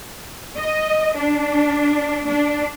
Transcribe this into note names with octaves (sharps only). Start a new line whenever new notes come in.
D#5
D4
D4